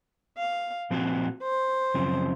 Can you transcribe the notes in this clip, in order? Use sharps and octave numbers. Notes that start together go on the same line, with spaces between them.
F5
A#2 F3 C4 F#4
C5
F#2 C#3 F3 C4